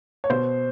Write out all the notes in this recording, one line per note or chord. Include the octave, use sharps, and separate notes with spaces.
C#5
B2 C5